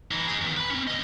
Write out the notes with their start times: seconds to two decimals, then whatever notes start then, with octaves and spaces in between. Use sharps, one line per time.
0.11 E3 D#4
0.27 D#4 G#4
0.41 E2 D#3
0.57 B4 B5
0.71 C4 C#4
0.87 D2 D#5